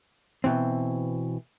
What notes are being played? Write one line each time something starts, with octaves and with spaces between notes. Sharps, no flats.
B2 E3 C4